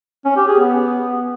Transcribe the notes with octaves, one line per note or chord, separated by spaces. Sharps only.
C#4
G4
G#4
B3